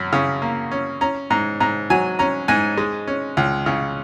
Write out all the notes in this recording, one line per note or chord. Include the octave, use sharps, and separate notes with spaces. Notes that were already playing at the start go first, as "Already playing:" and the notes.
Already playing: F#2 C#4
C#3
A#3
C#4
C#4 A#5
G#2 A#5
G#2 A#5
F#3 G#5
C#4 A#5
G#2 G#5
G#3
C#4
C#2
C#3